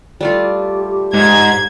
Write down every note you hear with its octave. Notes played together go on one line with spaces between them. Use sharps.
G3 A3 F4 G4
G#2 G#6